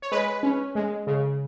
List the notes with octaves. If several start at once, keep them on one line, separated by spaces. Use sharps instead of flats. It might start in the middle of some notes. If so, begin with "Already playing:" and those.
C#5
G#3 B4
C#4
G#3
C#3